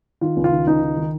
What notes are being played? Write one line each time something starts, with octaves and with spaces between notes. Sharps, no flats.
D#3 F4
C#2
F4
D#3
C#2 D#4
D#3
D#3